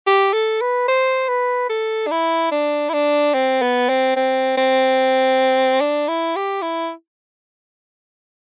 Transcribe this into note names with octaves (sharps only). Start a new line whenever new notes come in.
G4
A4
B4
C5
B4
A4
D4
E4
D4
E4
D4
C4
B3
C4
C4
C4
D4
E4
G4
E4